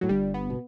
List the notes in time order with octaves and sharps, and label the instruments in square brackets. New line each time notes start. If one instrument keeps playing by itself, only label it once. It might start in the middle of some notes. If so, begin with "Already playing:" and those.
[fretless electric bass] A2 [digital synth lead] F#3
[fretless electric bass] G1 G2 [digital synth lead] G3
[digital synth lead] B3
[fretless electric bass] B2